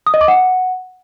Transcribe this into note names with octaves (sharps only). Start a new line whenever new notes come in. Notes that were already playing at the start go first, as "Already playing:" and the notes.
D#6
D#5
D6
F#5